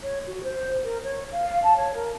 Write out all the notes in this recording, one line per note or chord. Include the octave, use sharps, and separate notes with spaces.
C#5
F#4
C5
A#4
C#5
F5
A5
C#5
A#4